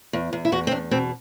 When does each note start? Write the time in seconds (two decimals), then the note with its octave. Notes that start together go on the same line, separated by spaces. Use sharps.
0.13 E2
0.33 E2
0.45 E4
0.52 E2 F#4
0.67 C4
0.71 E2 D4
0.91 B2 C4